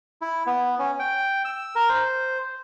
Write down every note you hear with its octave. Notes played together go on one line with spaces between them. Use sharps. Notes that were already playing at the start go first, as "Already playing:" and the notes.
E4
B3
C#4
G5
E6
A#4
C5